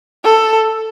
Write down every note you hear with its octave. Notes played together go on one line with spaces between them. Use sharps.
A4